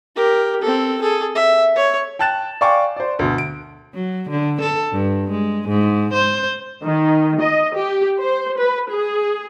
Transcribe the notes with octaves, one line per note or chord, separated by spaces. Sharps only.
G4 A#4
C4 A4
G#4 A4
E5
C#5
G5 A5 F#6 A6 E7 F#7
D5 F5 G5 G#5 C#6 D6
C5 D5
D2 B2
D7
F#3
D3
A4
G2
G#3
G#2
C5
D#3
D#5
G4
C5
B4
G#4